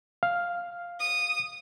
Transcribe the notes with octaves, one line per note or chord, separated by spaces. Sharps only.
F5
D#6